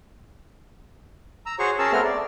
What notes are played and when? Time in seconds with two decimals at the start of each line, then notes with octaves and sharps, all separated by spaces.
1.46 A#5 E6
1.59 F#4 G#4 C5 C#5 C#6
1.79 C#4 G#4 A#4 A5 E6
1.93 A3 B3 C4 A#4 F6
2.05 D5